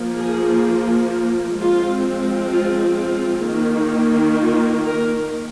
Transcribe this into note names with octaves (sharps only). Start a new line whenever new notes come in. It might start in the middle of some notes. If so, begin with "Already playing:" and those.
Already playing: F3 A#3
G#4
F3 G#3 C4 F4
F4
F4
D#3 A#3
F4
A#4